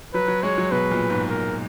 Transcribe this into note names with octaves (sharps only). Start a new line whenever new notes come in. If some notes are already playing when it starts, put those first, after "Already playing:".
F#3 B4
F#3
G#3 C#5
F#3
B2 B4
A#2
G#2
A#4